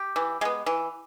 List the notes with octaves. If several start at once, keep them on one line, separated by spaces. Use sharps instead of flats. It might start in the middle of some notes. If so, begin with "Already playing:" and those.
Already playing: G4
E3
G#3 B3
E3